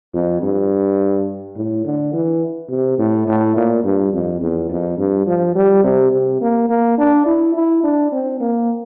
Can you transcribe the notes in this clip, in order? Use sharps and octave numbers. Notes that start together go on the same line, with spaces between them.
F2
G2
A2
D3
E3
C3
A2
A2
A#2
G2
F2
E2
F2
G2
F3
G3
C3
C3
A#3
A#3
D4
E4
E4
D4
C4
A#3